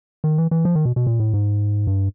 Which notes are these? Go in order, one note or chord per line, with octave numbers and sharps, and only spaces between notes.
D#3
E3
E3
F3
D#3
B2
B2
A#2
A2
G#2
G2